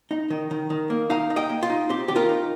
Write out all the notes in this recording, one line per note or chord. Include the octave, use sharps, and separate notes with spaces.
D#4
D#3
D#3
D#3
A#3
D#4 F5 A#5
D#4
D#5 G5
A#3
F4
D#4
C4 G4
D#3 G4
F4 A#4
D#4